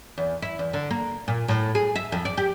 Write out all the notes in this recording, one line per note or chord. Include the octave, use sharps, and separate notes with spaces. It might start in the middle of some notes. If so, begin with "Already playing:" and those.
E2
E4
E2
D3
A#3
A#2
A2
G#4
E5
F2
D5
G4